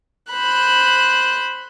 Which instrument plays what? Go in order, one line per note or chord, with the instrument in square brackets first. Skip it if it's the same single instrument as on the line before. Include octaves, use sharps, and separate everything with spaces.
[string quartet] C5 B5 F#6